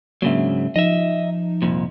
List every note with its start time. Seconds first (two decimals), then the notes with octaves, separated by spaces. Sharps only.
0.22 G#2 C#3 F#3 A#3 D4 E5
0.76 F3 D#4 D#5 E5
1.62 C2 F2 A#2